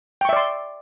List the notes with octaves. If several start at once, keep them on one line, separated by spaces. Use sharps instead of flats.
D5 E5 G5 C6 C#6